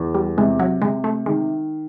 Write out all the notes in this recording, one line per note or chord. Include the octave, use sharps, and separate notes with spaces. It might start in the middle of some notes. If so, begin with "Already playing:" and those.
Already playing: E2
G3
C3 G#3
F#3
C3 G#3
A3
D#3 G#3